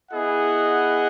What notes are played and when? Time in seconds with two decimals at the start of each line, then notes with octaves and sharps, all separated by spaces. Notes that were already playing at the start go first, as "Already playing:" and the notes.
0.11 B3 E4 G#4 D#5 F#5